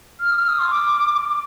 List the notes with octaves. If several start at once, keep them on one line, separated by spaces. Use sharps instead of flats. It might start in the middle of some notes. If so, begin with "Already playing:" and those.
F6
D#6
F6
D#6
C6
D6